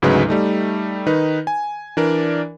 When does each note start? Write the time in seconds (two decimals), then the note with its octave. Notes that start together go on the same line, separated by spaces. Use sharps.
0.02 D2 G#2 C#3 F#3 D#4 B4
0.28 G3 A3 D#4
1.06 D#3 D#4 B4
1.47 G#5
1.97 E3 D4 A#4 D5